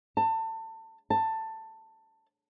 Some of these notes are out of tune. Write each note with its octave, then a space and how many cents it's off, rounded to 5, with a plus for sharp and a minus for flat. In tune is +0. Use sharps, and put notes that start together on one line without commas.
A5 +30
A5 +15